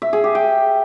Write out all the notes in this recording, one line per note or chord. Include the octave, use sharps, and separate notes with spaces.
E5
G#4
G4
G5